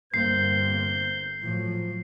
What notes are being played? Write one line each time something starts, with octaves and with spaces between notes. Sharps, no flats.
G1 A#3 C4 G6 C7
A2 F3 F#3